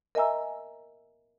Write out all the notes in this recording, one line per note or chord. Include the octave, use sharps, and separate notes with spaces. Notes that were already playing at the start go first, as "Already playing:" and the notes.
A#4 D#5 E5 G#5 A#5 E6